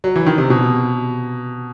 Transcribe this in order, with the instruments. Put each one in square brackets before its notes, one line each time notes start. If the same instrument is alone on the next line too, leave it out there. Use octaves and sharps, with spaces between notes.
[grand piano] F#3
E3
D#3
C3
B2